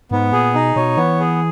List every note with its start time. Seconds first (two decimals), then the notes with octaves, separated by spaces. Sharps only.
0.11 G#2 B3
0.33 A#2 G#4
0.55 B2 D#4
0.76 B2 C#5
0.97 E3 B3
1.20 G#4